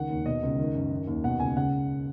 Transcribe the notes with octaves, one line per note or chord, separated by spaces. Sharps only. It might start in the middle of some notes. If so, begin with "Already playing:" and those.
Already playing: C#2 D#3 F#5
D#2
B2 D#5
C#2
D#3
F#2
D#3
D#2
B2 F#5
C#2 G#5
C#3 F#5